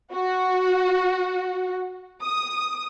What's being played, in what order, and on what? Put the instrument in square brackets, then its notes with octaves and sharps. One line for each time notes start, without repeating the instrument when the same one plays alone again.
[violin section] F#4
D#6